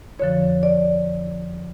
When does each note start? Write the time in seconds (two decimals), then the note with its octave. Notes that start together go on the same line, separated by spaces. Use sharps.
0.19 F2 D3 F3 C#5
0.63 D5